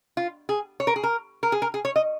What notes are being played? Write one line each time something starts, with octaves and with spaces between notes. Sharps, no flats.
F4
G#4
C#5
A#4
G#4
A#4
A#4
G#4
A#4
G#4
C#5
D#5